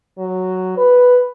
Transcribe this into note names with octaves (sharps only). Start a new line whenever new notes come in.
F#3
B4